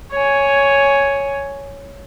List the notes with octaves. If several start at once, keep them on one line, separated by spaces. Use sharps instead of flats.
C#5 G#5